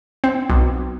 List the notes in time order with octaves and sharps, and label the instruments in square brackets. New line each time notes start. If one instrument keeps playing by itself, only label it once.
[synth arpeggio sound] C4
B1